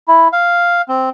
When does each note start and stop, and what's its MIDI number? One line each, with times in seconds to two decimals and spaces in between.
0.08 0.28 64
0.33 0.82 77
0.88 1.09 60